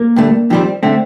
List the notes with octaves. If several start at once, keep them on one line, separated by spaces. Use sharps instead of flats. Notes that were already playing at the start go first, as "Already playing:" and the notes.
Already playing: A#3 A#4
G2 D3 A3
F2 D#3 G3 C4
D3 A3 C4